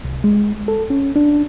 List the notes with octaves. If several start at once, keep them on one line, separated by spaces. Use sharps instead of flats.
C2
G#3
A4
C#4
D4